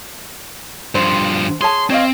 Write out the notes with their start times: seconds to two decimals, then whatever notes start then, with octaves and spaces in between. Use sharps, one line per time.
0.95 G2 F3 C5
1.61 G#4 C#5 A5 C6
1.90 C4 C#5 D#5 F5